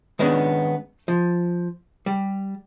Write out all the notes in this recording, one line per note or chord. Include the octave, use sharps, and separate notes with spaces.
D#3 G#3 B3 C#4 D4
F3
G3